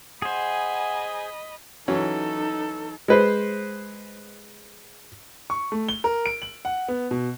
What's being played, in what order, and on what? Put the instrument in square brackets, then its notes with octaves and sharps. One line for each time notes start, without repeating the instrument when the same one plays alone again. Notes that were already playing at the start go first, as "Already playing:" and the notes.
[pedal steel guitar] G#4 C5 [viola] D#5 B5 [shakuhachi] F#5 [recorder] G#5
[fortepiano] E3 F#3 C#4 [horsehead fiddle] D#4 A4
[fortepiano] G#3 B4 C5
[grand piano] C#6
A3
G7
A#4
D7
F#7
F#5
B3
B2